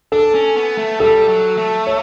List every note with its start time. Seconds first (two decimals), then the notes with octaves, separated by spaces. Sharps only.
0.12 D4 A4
0.35 C#4
0.56 B3
0.78 A3
0.99 G3 A4
1.28 F#3
1.57 A3
1.87 C#5